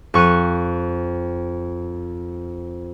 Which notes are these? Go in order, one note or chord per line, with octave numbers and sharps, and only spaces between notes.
F2 C#6 F#6 D#7